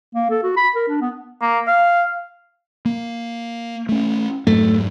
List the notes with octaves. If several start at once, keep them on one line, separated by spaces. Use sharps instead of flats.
A#3
A4
F#4
B5
A#4
D4
B3
A#3
F5
A#3
A3 C#4
F2 G#2 F#3 A3